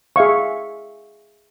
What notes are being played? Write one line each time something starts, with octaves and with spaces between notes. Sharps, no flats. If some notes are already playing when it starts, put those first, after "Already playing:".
G#4 E5 F5 C#6